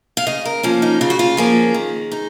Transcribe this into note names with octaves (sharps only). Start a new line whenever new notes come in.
F5
C#3 D#5
A#4
F3 A#3 C#4
D#4
C#3 F4
F#4
F4
F3 A#3 C#4 G#4
D#3
D#4